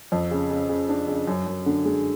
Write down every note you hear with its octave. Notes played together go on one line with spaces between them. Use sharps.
F2
C#3
C#3
C#3
D4
C#3
F#2
F#2
D3
G#3